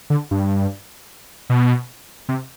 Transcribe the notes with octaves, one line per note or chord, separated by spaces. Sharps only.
D3
G2
B2
C3